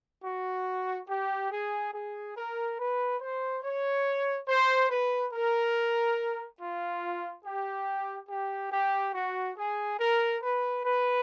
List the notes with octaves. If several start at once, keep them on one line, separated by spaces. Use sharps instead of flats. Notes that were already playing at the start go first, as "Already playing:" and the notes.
F#4
G4
G#4
G#4
A#4
B4
C5
C#5
C5
B4
A#4
F4
G4
G4
G4
F#4
G#4
A#4
B4
B4